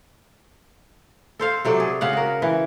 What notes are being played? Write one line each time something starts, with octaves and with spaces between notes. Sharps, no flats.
A4 C5 F5
C3 F#3 A4 D5
G#4
C#3 F5 F#5
F#4 A#4
E3